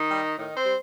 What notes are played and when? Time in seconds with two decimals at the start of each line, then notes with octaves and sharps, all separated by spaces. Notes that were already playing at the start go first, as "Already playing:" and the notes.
Already playing: D#3 D#4
0.11 G3
0.37 A2 D#3 D#4
0.56 C4 C5
0.66 G3